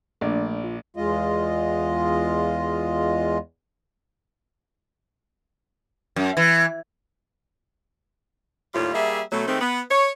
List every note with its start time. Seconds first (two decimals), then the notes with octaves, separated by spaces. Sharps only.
0.21 A#1 A3 D4 D5
0.64 F4
0.97 E2 G#3 F4 D#5
6.16 F#2
6.37 E3
8.74 D#2 A2 G3 F4
8.94 G3 A#3 G#4 E5
9.31 B2 F#3 A3
9.47 D#3 G#3 A3 C4
9.61 B3
9.90 C#5